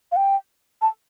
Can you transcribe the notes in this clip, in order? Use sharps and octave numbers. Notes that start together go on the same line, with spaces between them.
F5
G5
A5